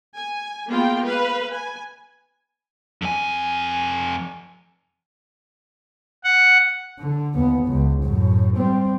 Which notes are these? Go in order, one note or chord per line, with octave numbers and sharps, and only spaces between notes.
G#5
G#3 A#3 B3 F4 G5
B4 F5
G#5
F2 G#5
F#5
D3
D#2 B3
C#2
F#2 A2
G3 C4